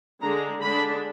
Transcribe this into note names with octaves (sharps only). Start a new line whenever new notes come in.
D3 G#3 D4 A#5
D3 G#3 D4 B5